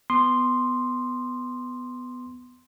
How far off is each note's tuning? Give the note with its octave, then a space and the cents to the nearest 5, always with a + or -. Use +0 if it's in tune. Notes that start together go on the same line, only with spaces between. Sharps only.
B3 +10 C6 +0 D#6 -40